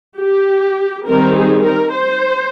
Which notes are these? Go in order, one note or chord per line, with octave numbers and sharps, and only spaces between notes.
G4
D#3 G3 C4 D#4 A#4
G#4
A#4
C5